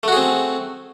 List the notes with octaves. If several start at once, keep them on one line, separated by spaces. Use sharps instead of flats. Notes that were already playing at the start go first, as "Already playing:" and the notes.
A3 C4 F#4 G#4